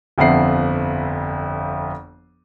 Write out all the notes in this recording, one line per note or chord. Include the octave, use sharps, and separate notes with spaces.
G1 F2 F3 E5 F#5 C7